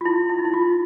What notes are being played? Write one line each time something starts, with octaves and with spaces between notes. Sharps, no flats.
F4
E4
E4
D#4
E4
F4